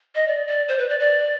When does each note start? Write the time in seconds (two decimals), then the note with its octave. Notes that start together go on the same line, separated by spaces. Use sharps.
0.15 D#5
0.28 D5
0.47 D5
0.68 C5
0.79 B4
0.89 D5
1.00 D5